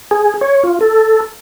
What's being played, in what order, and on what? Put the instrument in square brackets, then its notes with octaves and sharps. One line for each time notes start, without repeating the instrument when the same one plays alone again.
[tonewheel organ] G#4
C#5
F4
A4